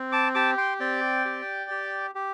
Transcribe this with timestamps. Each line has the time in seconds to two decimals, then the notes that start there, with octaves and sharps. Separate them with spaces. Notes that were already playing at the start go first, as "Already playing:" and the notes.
Already playing: C4
0.12 A5 D6
0.35 G4 A5 D6
0.57 G5 C6
0.80 C4 D5 G5
1.25 G4
1.71 G4
2.15 G4